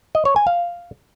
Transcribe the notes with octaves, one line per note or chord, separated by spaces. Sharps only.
D#5
C#5
G#5
F5